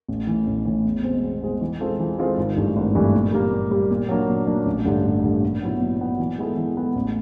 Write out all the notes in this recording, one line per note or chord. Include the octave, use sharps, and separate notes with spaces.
A1
A2 E3
A1
A2 E3
E2
B2 G#3 C4
E2
B2 G#3 C4
E3
G#3 C4 F4 A4
E3
G#3 C4 F4 A4
G#1
G2 E3 A3
G#1
G2 E3 A3
A#2
G3 A#3
A#2
G3 A#3
A#2
F#3 A#3 D4
A#2
F#3 A#3 D4
A1
G2 D3
A1
G2 D3
A#2
F#3 B3 E4
A#2
F#3 B3 E4
E3
G#3 B3 E4 A4
E3
G#3 B3 E4 A4
A1